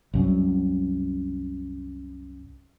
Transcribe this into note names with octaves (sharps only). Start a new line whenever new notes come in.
C2 F#2